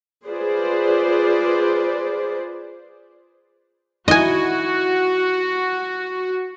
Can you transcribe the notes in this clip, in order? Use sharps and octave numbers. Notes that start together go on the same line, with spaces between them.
F4 G#4 B4 C5 D5
D#4 E4 F#4 D#5 G#5